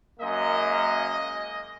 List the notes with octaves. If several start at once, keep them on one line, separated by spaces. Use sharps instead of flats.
F#2 G#3 A#3 D#5